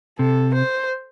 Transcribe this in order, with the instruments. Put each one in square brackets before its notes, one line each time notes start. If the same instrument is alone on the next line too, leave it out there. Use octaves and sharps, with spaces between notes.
[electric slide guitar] C3 [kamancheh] A4
[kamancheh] C5